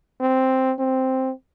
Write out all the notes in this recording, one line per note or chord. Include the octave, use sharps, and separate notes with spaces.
C4
C4